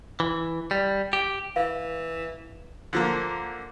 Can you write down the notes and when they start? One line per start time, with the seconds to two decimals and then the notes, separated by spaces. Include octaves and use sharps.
0.20 E3
0.71 G3
1.13 G4
1.56 E3 F5
2.93 D3 F3 A#3